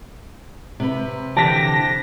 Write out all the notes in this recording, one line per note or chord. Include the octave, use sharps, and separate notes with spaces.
C3 B4
D3 E3 G4 A5 A#6 B6